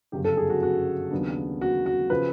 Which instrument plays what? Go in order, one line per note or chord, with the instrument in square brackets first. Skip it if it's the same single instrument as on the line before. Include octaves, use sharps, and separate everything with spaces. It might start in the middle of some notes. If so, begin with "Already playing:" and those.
[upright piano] G1 F#2 C#3 G4
A4
G#4
F#4
F#4
D#2 C#3 F#3 B3 D4
F#4
F#4
C#3 F3 B4